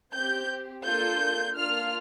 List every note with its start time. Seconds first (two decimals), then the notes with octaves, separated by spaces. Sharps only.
0.13 C4 G4 G6
0.84 A#3 D4 F4 A4 G6
1.56 A#3 D4 F4 F6